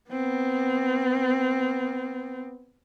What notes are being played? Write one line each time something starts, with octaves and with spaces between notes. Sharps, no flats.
B3 C4